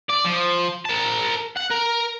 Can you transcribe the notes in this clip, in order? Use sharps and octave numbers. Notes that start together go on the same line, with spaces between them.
D5
F3
A#4 A5
F#5
A#4